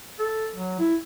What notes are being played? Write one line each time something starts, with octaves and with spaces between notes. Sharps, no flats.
A4
F#3
E4